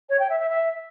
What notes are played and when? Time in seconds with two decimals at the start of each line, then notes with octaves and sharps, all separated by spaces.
0.09 C#5
0.19 G5
0.30 E5
0.40 E5
0.50 E5